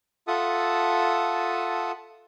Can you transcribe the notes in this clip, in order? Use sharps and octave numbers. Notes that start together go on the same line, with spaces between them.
F4 A4 E5 F#5 A5 D#6